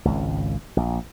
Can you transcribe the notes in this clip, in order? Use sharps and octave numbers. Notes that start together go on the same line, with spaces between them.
G#1 C#2
A#1